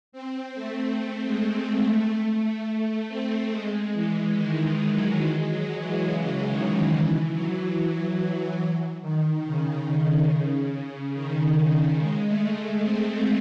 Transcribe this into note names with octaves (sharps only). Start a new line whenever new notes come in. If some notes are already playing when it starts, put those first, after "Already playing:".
C4
A3
C4
G#3
A3
A3
A3
A3
C4
G#3
E3
D#3
E3
F#3
G#3
F#3
E3
C#3
D#3
E3
F#3
D#3
C#3
D#3
C#3
G#3
A3
A3
C4